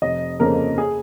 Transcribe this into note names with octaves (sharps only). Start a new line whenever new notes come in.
F1 D#5
F2 C#3 A#3 A#4
G#4